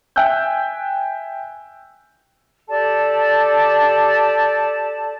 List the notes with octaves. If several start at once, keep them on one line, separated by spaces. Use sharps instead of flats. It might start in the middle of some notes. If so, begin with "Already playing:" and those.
E5 G5 G#5 E6 F#6 G6
G4 A4 D5 A5